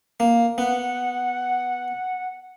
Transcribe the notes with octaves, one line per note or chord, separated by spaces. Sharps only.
A#3
B3 F#5